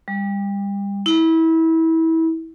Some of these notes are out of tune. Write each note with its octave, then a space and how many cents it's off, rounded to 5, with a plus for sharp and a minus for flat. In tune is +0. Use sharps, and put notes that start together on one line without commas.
G3 +30
E4 -25